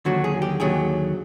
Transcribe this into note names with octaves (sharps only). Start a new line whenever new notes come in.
D#2 D3 F#3 F#4
G#4
G4
D#2 D3 F#3 G#4